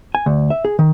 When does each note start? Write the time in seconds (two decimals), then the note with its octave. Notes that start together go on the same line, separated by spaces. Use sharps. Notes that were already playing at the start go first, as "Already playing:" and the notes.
0.15 G#5
0.26 D2
0.50 E5
0.65 G#4
0.79 D#3